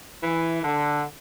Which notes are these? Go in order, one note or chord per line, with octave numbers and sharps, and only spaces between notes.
E3
D3